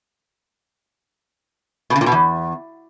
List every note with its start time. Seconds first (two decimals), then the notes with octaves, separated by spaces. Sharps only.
1.90 B2
1.96 C#3
2.01 A#2
2.06 B2
2.12 E2